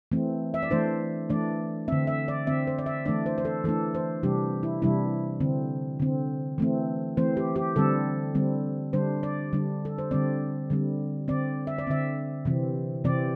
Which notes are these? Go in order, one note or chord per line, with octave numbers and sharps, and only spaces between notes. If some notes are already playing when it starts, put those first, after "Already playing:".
E3 A3 C4
E5
D5
E3 A3 D4 C5
E3 A3 D4 D5
D3 C4 E5
E5
D5
D3 C4 E5
C5
D5
E5
E3 A3 D4 D5
C5
C5
A4
E3 A3 D4 A4
C5
C3 E3 G3 D4 G4
E4
C3 E3 G3 D4 E4
D3 C4
D3 C4
E3 A3 C4
E3 A3 C4 C5
G4
G4
D3 G3 C4 A4
D3 G3 C4
D3 G3 D4 C5
D5
D3 G3 D4
A4
C5
D3 G3 C4 D5
D3 G3 C4
D3 C4 D5
E5
D5
D3 C4 E5
C3 E3 C4
C3 E3 C4 D5